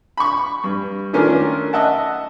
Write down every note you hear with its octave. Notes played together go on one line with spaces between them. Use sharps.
B5 C#6
G2
D#3 A3 C#4 D4 F4 A#4
D#5 E5 F#5 A5